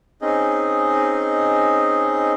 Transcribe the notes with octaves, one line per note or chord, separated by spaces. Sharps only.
C4 C#4 D#4 G#4 D#5